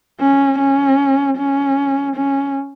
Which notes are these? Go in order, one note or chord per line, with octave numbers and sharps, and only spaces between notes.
C#4
C#4
C#4
C#4